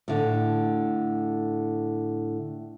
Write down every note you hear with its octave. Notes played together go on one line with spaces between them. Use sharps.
A2 D3